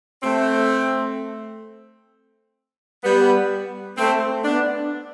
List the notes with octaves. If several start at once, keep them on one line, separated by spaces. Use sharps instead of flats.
A3 C4
G3 B3
A3 C4
B3 D4